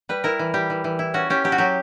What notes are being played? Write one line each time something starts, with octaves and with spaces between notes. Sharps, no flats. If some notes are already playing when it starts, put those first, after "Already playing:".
G3 B4
E4 A#4
E3
G3 G4
E3
E3
E4
C#4 F#4
C#4 G4
F#3 G4
F#4
F#3 G4